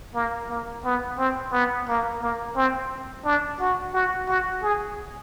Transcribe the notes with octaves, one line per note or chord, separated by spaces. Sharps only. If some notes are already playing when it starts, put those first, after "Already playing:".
A#3
A#3
B3
C4
B3
A#3
A#3
C4
D4
F#4
F#4
F#4
G#4